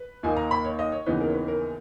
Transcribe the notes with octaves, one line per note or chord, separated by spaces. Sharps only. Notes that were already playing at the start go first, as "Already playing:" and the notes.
Already playing: B4
D#2 D#3 A#3 D#4 G#5
A#5
B5
C#5
D#5
C#5
D#2 C#3 E3 B3 D#4 B4
A#4
C#5
B4
A#4